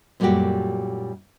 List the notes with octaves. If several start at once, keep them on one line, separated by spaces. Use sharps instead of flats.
F#2 A#2 G3 A3 F#4 G4